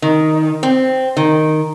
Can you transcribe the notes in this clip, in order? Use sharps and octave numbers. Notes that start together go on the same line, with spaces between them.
D#3
C4
D#3